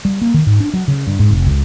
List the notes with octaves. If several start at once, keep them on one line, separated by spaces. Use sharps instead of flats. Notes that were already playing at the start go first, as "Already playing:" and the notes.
G3
A#3
D#3
G#2
D4
F#3
C#3
G2
G#2
F1
C#2